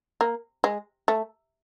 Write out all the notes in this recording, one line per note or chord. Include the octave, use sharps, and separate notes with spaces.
A#3
G#3
A3